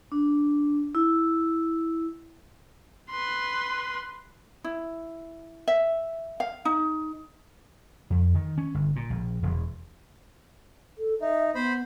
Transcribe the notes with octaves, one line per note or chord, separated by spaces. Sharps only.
D4
E4
B4 C6
E4
E5
F5
D#4
F2
D#3
C#4
G1
A#2
A#1
E1
A4
D#4 E5
B3 C5 B5